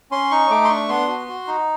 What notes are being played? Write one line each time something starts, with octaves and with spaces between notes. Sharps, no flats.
C#4 C6
D#4 C#6
A3 D6
C6
D4 C#6
B3 C6
F#4
F#4
D#4